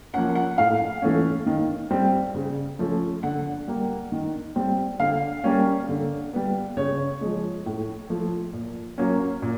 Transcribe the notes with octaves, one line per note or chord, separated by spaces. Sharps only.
F3 A#3 C#4 F#5
F#5
A2 F5
E3 A3 C#4
D#3
G3 C4
C#3
F3 A3 C#4
D3 F#5
G3 A#3
D#3
G3 C4
D3 F5
G3 A#3 C#4
D3
G3 B3
C#3 C#5
F3 G#3
A2
F3 A3
A#2
F#3 A#3 C#4
A#2